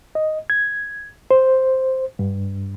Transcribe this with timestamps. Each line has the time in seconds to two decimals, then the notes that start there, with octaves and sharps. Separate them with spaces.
0.15 D#5
0.50 G#6
1.31 C5
2.19 G2